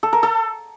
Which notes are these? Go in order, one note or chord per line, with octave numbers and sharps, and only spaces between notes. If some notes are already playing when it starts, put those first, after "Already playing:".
A4
A#4
A4